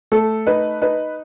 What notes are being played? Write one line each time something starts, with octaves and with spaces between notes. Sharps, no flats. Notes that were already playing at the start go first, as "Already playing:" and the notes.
A3 A4
D#4 B4
D#4 B4